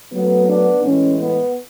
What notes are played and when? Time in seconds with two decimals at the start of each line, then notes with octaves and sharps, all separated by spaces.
0.11 C#3 F#3 A3 B3
0.47 B3 D4
0.82 A2 E3 G#3 C#4
1.18 B3